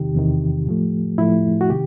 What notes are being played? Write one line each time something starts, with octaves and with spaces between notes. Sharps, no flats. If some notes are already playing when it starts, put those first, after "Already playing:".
Already playing: E2 C3 D#3 G4
E2 C3 D#3
A2 F3 A3
A2 F3 A3 E4
F#4
C3 D#3 G4